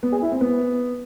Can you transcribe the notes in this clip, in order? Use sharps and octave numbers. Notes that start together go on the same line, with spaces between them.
B3
G#4
E4
C4
B3